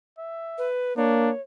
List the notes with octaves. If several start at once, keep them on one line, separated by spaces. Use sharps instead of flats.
E5
B4
A#3 D4 C#5